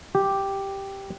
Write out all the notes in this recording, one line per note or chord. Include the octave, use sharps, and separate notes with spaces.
G4